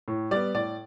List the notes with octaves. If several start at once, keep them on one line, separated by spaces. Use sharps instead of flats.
A2
G3 B3 D5
A2 D5